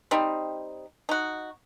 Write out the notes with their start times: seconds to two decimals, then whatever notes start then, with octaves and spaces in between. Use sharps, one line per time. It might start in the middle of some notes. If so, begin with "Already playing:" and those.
0.11 G3 C4 D#4
1.09 D#4 F#4